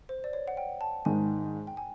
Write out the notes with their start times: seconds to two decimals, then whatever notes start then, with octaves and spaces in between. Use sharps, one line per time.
0.09 C5
0.24 D5
0.33 C#5
0.48 F#5
0.57 G5
0.81 A5
1.05 G#2 D#3 G#3 G#5
1.67 G5
1.77 G#5